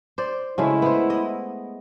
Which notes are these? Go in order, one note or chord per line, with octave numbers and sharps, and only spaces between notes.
C5 D5
C#3 G#3 A3 E4
B3 C5
D#5